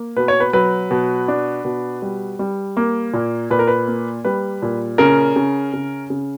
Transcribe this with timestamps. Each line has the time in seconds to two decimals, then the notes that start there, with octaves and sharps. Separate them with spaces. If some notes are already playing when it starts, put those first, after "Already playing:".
Already playing: A#3
0.17 B2 B4
0.28 C#5
0.40 B4
0.53 F#3 B4
0.91 B2
1.28 D4
1.65 B2
2.02 G3
2.39 G3
2.77 A#3
3.14 A#2
3.51 A#2 B4
3.59 A#4
3.68 B4
3.88 A#3
4.25 G3 B4
4.62 A#2
4.98 C#3 A#4
5.36 C#3
5.73 C#3
6.10 C#3